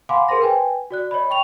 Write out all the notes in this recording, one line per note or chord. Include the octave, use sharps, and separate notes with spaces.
F5 F#5 G#5 B5 C6 D6
G#4 A#4 C5 C6 A#6
B4 G5 G#5
F#4 D5 F#6
C#5 D#5 B5
G5 C#6 F7